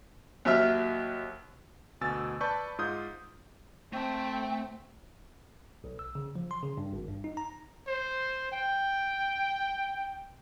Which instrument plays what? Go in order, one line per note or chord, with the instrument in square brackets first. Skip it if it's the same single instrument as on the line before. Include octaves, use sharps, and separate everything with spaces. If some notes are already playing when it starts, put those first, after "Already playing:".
[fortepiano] D#2 F#3 E5 E6 F6
[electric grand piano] D2 B2 G#5 E6 A6
B4 D5 A5 B5 C#6 G6
G#2 F4 D#6 G6
[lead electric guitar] A3 A5 [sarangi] C4 [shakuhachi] G5
[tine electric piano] B1
E6
C#3
F3
C6
C#3
G2
G#1
G2
D#4
A#5
[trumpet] C5
G5